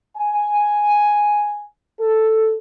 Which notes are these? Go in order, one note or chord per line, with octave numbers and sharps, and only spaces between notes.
G#5
A4